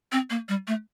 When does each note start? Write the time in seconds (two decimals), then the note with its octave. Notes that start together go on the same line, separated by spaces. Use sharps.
0.12 C4
0.30 A#3
0.49 G3
0.67 A3